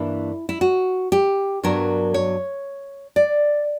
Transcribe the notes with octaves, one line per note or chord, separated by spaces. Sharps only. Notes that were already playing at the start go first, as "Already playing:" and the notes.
Already playing: G2 E3 A#3 D4 E4
E4
F#4
G4
G2 F#3 B3 D4 A#4
C#5
D5